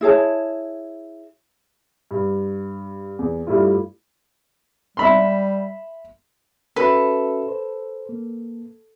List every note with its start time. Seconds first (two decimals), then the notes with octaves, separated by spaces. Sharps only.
0.01 E4 G#4 C#5 A5
2.11 G2
3.19 E2
3.47 G2 G3 A3 E4 F4
4.97 G3 E5 B5 C6
6.76 C#4 F#4 A4 B4 E5
7.48 C5
8.09 A#3